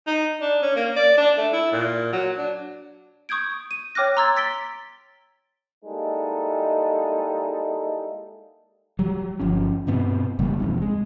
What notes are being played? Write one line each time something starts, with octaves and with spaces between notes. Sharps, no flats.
D#4
D4
C#4
A#3
D5
D4
A3
E4
A#2
F#3
D4
C#6 D#6 G6 G#6 D7
D#7
C#5 G5 D6 F6 F#6 A#6
A#5 C6 E6 G#6 A6
A6 B6 D7 G7
G3 G#3 A#3 D#4 E4 A4
F#3 G3
G1 F3 C#4
G2 B2 B3 C4
F#1 C#3 G3 A#3
E1 C2 F2 G#2
G#3